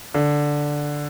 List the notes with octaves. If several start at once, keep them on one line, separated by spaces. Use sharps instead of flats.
D3